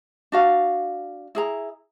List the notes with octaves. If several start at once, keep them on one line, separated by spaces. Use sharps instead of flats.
D4 F#4 F5
E4 G#4 A#5